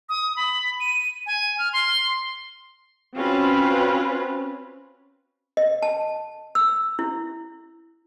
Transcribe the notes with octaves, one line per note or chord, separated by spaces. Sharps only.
D#6
B5
D#7
G#5
F6
C6
C4 C#4 F4 F#4 B4
D#5
A5
E6
E4